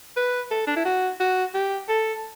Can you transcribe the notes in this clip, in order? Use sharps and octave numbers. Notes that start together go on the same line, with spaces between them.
B4
A4
D4
E4
F#4
F#4
G4
A4